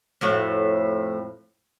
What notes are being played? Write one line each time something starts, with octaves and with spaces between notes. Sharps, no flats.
F2 A2 F#4